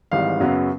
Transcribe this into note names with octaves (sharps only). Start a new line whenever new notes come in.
G#1 G#2 E3 G3 F5
F#2 C#3 F#3 B3